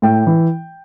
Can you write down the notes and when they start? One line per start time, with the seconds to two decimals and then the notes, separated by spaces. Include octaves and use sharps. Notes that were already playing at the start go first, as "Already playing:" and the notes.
0.02 A2 G5
0.27 E3